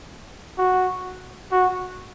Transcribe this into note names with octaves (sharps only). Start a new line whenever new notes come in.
F#4
F#4